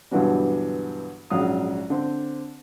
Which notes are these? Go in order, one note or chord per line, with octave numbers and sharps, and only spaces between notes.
G2 B2 D3 E3 F#3 G3
A#1 G#2 C#3 F#3 F5 D#6
D3 C4